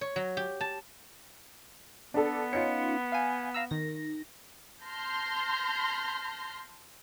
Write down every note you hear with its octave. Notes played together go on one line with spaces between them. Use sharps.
C#5
F#3
G4
A5
B3 D4 A4
C#4 D#4 F4 C#7
F5 G#5
F5 A#5 E6
D#3 A#6
A5 C6 F6 G6 A#6